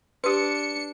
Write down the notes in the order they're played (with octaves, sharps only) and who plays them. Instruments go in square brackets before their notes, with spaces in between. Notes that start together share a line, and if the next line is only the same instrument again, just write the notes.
[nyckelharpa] D4 [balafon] G4 C6 [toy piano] B4 [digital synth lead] C#7